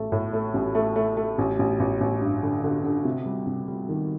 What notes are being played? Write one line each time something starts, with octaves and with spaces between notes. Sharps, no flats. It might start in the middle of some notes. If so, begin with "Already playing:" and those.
Already playing: A1 A3
A2
A3
A1
A3
A3
A3
A1
A1
A1
A1
G2
D3
D3
D3
C3
G3
C3
G3
D#3